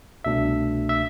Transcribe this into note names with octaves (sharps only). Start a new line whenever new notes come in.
C2 B2 A3 D4 E5
E5